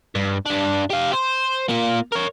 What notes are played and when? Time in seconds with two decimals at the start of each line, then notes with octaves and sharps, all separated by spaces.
0.15 G2
0.46 G2 D4
0.90 G4 F5
1.13 C5
1.69 A#3 F4
2.12 A#4 C#5